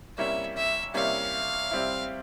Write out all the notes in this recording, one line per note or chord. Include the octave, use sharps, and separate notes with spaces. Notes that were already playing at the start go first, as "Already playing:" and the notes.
C3 G3 A#3 C#4 E4 E5
E5
C3 G3 A#3 C#4 E4 F5
C3 G3 C4 E4